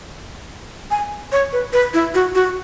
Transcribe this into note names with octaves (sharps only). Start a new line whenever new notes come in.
G#5
C#5
B4
B4
E4
F#4
F#4